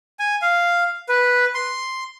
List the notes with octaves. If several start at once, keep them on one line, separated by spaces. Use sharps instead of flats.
G#5
F5
B4
C6